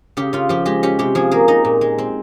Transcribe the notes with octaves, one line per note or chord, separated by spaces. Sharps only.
C#3 G4
C#3 F4
F3 G4
G#3 G4
C#4 G4
C3 G4
F3 G#4
A#3 G#4
D#4 D#5
A#2
G#3
C4